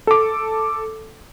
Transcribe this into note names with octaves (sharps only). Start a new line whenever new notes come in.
A4 D6